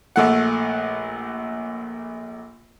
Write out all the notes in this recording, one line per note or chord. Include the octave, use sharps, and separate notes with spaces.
A#1 A3 F#5